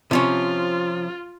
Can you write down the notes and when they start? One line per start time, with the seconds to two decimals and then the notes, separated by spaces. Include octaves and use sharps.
0.11 C3 F3 C#4 F4